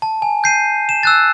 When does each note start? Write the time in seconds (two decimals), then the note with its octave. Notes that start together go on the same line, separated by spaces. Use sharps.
0.02 A5
0.22 G#5
0.44 G6 C7 D#7
0.89 E7
1.03 E6 F#6 A6